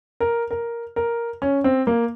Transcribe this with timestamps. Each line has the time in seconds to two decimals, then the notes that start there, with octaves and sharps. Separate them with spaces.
0.20 A#4
0.51 A#4
0.96 A#4
1.42 C#4
1.64 C4
1.87 A#3